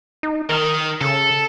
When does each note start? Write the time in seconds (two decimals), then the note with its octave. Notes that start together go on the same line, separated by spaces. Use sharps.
0.23 D#4
0.49 D#3 A#4
1.01 C#3 A4